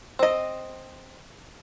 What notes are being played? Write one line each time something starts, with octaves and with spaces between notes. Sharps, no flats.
C4 D#5